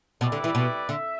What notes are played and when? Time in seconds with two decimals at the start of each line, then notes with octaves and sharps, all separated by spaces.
0.21 B2 G3 E4 B4 D5
0.32 D3
0.44 E3
0.55 B2
0.89 D3 E5